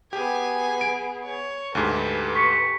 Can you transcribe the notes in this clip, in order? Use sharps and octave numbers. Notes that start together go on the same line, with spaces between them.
B3 G4 G#4 G#5
D7
C#5
D2 G#2 G4 A4 B4
C#6 B6 C#7